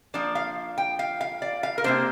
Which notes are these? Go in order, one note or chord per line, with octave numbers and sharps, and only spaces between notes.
F3 A#3 D4 D5
F5
G5
F5
F5
D5
F5
A#4
C3 A#3 D4 C5